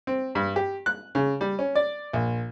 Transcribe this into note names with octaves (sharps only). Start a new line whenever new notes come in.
C4
G2
G4
F#6
C#3
G3
C#4
D5
A#1